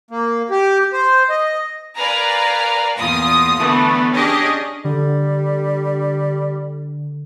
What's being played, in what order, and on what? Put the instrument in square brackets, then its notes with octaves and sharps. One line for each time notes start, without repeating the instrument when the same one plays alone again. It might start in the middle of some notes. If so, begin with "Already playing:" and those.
[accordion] A#3
G4
C5
D#5
[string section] A#4 B4 D5 F5 G#5 A#5
E2 A#2 F4 D#6
D3 E3 A3 B3
C#4 D4 G4 G#4 D#5
[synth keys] D3 [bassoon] G3